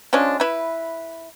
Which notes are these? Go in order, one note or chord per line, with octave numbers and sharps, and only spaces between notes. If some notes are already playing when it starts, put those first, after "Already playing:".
F3 G#3 C#4 D4
E4 B4